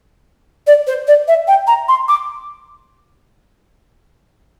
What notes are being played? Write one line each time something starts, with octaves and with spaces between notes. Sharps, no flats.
D5
C5
D5
E5
G5
A#5
C6
D6